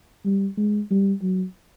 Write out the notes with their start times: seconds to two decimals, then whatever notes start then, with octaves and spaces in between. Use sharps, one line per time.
0.25 G3
0.57 G#3
0.90 G3
1.21 F#3